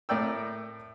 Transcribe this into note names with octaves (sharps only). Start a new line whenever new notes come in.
A2 A#4 D5 G5 E6